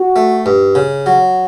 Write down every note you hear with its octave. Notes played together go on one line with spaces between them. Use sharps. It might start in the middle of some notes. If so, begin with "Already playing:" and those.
Already playing: F#4
A3
G2
C#3
F#3